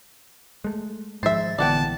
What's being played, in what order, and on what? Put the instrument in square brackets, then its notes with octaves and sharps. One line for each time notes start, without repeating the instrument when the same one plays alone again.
[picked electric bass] G#3 A3
[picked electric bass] G#2 D#3 G#3 [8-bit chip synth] F3 A6 [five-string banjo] C5 E5
[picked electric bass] A#1 E3 [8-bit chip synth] D3 B3 [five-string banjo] D5 F#5 G5 [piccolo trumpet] A5